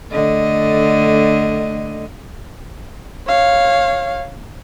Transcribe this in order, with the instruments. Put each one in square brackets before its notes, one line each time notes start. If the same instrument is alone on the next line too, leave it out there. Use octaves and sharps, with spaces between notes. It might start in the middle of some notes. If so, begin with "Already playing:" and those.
[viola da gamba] D3 A3 D#5
[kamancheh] C#5 F5